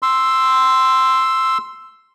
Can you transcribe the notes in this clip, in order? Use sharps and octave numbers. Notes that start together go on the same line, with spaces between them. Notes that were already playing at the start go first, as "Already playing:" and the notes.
C6 E6